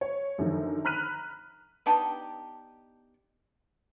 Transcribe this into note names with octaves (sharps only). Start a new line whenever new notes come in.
C#5
F#2 D3 D#3 F3
A#5 B5 F6 F#6 B6 D#7
B3 D4 D#4 G4